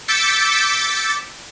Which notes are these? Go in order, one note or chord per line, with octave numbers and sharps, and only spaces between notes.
D6 E6 G6 A6 B6 C#7